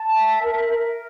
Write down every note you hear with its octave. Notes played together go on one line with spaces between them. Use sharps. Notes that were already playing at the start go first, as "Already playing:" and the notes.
Already playing: A5
E5
A#4
A#4